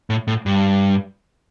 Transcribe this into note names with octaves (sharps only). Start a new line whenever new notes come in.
A2
A2
G2